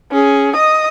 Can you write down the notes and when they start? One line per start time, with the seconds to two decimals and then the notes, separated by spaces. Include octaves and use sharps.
0.12 C#4 G#4
0.56 D#5 D#6